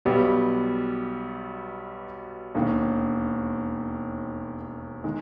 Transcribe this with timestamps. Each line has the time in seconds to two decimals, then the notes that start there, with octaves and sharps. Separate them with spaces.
0.05 B1 B2 G3 B3 G4
2.55 E1 D#2 D#3
5.04 D#3 G#3